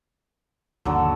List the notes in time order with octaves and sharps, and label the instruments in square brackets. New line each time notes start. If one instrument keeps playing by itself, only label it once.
[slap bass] G1 D#2 [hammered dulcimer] D3 F#3 A4